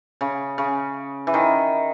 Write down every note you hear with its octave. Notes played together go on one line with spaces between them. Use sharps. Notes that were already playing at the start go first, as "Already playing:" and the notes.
C#3
C#3
E3
D#3